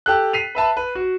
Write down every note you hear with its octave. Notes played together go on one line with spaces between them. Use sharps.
G4 A4 F#6
B6 C7 D#7 F7
B4 E5 A5 B5
B4
F#4